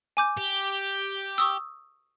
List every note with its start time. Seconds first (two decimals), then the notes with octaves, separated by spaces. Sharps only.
0.17 G#5 D6 G6
0.37 G4
1.38 C#6 D#6 E6